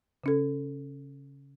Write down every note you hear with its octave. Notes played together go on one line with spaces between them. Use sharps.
C#3 C#4 A4